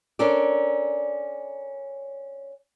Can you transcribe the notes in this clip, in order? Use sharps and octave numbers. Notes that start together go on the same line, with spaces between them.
C#4 D4 A4 A#4 D5